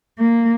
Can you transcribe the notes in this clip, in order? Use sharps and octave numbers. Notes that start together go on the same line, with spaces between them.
A#3